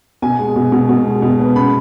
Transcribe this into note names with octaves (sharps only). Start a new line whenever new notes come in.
B2 G#5
G#3
B2
B2
B2
G#3
B2
B3
C#3 B5